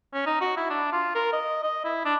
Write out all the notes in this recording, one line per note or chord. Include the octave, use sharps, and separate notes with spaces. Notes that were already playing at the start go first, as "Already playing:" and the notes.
C#4
D#4
F#4
E4
D4
F4
A#4
D#5
D#5
E4
D4